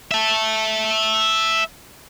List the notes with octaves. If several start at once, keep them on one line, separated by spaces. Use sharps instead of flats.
E5 A5